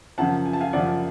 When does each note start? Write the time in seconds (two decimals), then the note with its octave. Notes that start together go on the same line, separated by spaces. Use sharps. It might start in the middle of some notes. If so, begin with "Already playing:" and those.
0.18 F#2 C#3 F3 F#5 A5
0.46 G#5
0.53 A5
0.61 F5 G#5
0.73 F#2 C#3 F3 D5 F#5